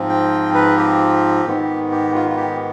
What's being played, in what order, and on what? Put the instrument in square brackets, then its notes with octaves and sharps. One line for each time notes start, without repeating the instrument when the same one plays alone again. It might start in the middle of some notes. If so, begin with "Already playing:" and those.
Already playing: [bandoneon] G#2 F3 C4 F4
G5
B4
G4
G#2 D#3 B3
G4
F4
F4
G4